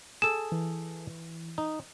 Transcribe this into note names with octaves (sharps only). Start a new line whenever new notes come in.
G#4 A4 E7
E3
D#4